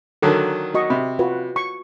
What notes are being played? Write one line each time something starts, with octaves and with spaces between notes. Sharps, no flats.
D3 D#3 F#3 A4 A#4
F#4 D#5 C#6
C3 B5
F4 F#4 B4
C#6